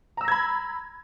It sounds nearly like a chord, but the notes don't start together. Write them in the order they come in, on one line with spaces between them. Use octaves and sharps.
A#5 E6 A#6 G#6 B5